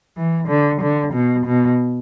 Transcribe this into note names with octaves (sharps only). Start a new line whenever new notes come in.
E3
D3
D3
B2
B2